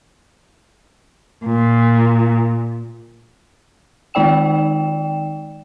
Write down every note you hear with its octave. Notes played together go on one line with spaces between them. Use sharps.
A#2
D#3 G#3 D#4 D5 G5 E7